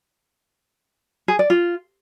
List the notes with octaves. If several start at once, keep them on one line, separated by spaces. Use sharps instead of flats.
G#4
D5
F4